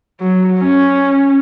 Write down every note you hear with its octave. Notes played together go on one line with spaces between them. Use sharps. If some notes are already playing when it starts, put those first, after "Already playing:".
F#3
C#4